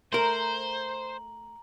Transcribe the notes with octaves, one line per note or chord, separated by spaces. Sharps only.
A3 A#4 C5 A#5 F#7